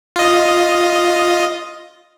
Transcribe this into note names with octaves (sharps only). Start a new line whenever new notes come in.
F4 D#5